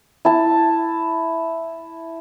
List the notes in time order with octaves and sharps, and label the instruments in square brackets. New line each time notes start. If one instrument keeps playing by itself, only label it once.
[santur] E4 A5